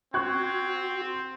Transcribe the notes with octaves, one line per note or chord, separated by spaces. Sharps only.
C4 F#4 C#6 F#6 G#6